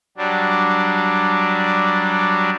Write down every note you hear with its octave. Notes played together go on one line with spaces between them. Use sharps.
F#3 G3 D4